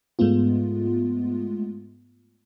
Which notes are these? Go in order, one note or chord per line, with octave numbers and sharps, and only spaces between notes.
G#2 G#3 A3 B3 F4